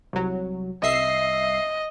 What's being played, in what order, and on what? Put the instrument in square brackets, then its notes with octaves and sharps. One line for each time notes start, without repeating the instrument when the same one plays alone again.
[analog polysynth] C2 F#3
[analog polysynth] C2 E5 C7 [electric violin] D#5